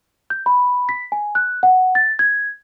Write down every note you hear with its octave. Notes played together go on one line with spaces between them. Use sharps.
G6
B5
B6
G#5
F#6
F#5
A6
G#6